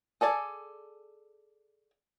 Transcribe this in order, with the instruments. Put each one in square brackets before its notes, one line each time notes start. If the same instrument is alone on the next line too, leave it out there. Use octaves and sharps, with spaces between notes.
[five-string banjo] G#4 A4 D5 G#5